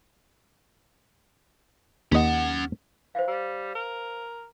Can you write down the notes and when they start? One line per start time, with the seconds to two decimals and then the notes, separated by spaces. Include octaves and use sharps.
2.12 D#2 C#4 D#5 F#5
3.15 E3 C5 F5
3.28 G3
3.75 A#4